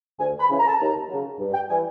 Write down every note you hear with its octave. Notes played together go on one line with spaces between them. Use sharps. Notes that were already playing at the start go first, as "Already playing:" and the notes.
D2 G#5
B5
C#3 E3
A#5
A5
D#2 A#5
C#3 F#3
G2
G5
E3 G3 G#5